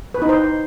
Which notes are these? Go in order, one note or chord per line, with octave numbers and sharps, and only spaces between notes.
B4
D#4
C5